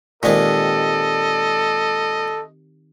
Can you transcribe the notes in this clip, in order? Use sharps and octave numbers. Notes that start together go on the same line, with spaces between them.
A#2 D#3 G#3 C4 G4 A4 D#5